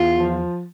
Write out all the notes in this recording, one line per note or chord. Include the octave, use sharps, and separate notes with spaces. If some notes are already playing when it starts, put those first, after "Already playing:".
Already playing: E2 F4
F3